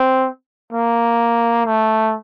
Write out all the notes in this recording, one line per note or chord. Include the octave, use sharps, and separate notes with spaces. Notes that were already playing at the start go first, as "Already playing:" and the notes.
Already playing: C4
A#3
A3